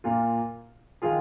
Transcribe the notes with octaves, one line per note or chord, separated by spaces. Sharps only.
A#2 A#3 F4
D#3 G#3 F4 G#4